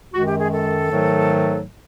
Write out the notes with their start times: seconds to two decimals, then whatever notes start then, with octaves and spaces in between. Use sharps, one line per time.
0.13 F#2 D#3 G#3 F#4
0.26 G4
0.38 G#4
0.51 A4
0.89 G#2 D#3 F#3 A3